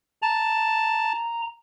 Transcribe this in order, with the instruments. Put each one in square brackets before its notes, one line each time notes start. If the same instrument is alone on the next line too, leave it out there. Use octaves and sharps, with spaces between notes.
[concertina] A5 [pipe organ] A#5